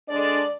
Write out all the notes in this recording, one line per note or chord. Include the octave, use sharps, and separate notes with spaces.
D3 G#3 D4 D5